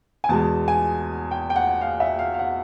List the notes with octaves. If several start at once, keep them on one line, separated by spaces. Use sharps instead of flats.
G#5
E2 B2 G#3 A5
G#5
G5
G5
F#5
F5
E5
F5
F5
F#5